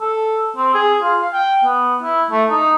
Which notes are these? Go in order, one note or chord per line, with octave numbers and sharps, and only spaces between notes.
A4
C4
G#4
F4
F5
G5
B3
E4
A3
D#4